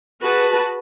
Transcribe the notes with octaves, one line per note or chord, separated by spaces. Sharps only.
F#4 G#4 B4 A5